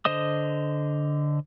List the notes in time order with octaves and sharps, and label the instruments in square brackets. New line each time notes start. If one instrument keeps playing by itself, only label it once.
[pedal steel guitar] D3 C5 D#5 D#6